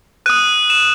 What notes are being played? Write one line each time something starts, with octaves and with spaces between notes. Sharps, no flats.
D#6 F#6 D#7
E7